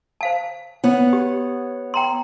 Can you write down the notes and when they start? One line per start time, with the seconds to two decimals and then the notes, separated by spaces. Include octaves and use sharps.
0.21 C5 F5 A5
0.84 B3 C#5 F#5
1.13 G4
1.94 G5 A#5 C6